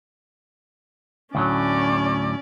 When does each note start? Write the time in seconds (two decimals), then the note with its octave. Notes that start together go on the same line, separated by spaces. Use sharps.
1.35 D2 A2 F#3 C#4 D5